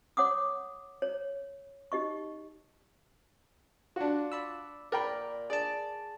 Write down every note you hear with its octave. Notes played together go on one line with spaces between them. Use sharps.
C#5 F#5 D6 D#6
C#5
D#4 G4 D#5 C#6
D4 F4 F#4
D5 B5 E6
A#2 A#4 D5 G5 B5
G#4 D5 A5